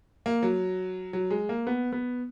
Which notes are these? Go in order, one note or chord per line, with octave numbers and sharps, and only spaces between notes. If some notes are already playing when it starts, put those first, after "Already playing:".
A#3
F#3
F#3
G#3
A#3
B3
B3